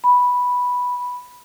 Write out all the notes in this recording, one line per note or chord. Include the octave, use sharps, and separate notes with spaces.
B5